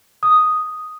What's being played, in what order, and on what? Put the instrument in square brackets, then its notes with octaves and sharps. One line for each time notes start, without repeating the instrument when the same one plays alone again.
[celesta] D#6